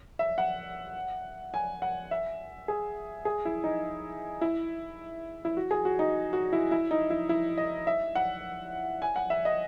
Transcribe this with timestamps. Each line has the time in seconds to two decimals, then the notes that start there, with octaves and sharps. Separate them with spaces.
0.19 E5
0.38 F#5
1.54 G#5
1.82 F#5
2.11 E5
2.68 G#4
3.25 G#4
3.45 E4
3.64 D#4
4.41 E4
5.45 E4
5.57 F#4
5.71 G#4
5.85 F#4
5.99 D#4
6.33 F#4
6.53 E4
6.71 E4
6.91 D#4
7.10 E4
7.29 E4
7.58 D#5
7.87 E5
8.15 F#5
9.02 G#5
9.16 F#5
9.30 E5
9.45 D#5